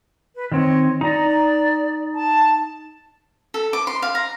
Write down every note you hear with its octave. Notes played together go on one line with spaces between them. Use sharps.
B4
D#3 C4 C#5 D#5
D#4 D5 A#5
A5
A4
D6
C6
F5
A#5